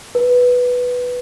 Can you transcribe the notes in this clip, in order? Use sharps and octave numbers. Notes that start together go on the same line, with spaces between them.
B4